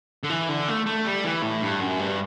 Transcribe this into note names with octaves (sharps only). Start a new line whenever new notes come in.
D3
E3
D3
A3
A3
G3
E3
A2
G2
F#2
G2